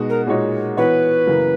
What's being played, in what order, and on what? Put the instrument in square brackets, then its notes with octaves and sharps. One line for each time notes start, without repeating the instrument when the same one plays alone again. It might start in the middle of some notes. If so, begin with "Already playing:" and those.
Already playing: [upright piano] B2 G#3 D#4 F#4
[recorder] A#4
[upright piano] A#2 G#3 D#4 F#4 C#5
[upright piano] E3 B3 F#4 C#5 [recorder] B4
[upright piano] F#2 C#3 E3 A#3